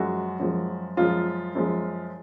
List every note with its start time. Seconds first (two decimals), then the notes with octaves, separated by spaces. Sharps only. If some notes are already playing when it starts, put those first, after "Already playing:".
Already playing: F#2 F3 G#3 F#4
0.39 F#2 F3 G#3
0.97 F#2 F3 G#3 F4
1.55 F#2 F3 G#3